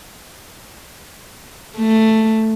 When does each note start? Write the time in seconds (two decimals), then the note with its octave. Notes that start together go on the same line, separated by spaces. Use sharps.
1.77 A3